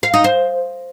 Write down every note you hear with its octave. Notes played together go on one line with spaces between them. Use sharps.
F5
D#4
C5